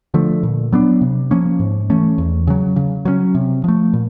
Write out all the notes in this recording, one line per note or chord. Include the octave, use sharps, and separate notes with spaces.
D3 F3 A3
A#2
F#3 B3 D4
C3
F3 A#3 C#4
G#2
E3 A3 C#4
E2
C#3 F#3
C#3
F#3 A#3 C#4
C3
F3 A3
A#2